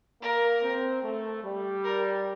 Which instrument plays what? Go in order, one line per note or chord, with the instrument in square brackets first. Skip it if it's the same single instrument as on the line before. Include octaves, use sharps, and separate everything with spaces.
[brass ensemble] A#3 [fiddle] A#4
[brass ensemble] C4
A3
G3
[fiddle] A#4